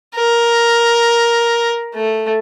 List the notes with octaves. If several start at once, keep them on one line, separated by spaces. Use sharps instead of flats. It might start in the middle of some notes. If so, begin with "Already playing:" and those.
A#4
A3